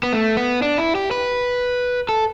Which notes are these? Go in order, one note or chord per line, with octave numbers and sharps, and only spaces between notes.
B3
A3
B3
D4
E4
G4
B4
A4